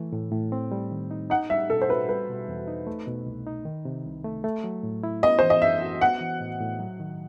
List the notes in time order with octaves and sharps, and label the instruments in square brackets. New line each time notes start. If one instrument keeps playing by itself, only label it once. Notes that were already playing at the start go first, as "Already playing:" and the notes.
Already playing: [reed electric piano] E3 A3
A2
A2
C4
G3
D#3
D#4
[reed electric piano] D#4 [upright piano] F#5
[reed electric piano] G3 [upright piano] E5
[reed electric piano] B2 [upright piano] A4
[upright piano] C5
[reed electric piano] F#4 [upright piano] B4
[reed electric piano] G3 [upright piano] B4
[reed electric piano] B2
E2
D#4
A3
B2
C2
D#4
D#3
C3
C2
A3
A3
F#3
A2
E4
[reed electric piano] B3 [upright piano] D#5
[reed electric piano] E3 [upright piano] C5
[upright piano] D#5
[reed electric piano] F#2 [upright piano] E5
[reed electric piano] F#4
[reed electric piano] B3 [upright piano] F#5
[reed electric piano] E3
A2
A2
F#3
D#3